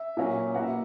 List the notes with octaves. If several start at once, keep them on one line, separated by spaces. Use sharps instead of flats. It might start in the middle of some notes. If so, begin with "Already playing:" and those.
Already playing: E5
A#2 F#3 A#3 C#4
B2 A#3 E4 F#5
E5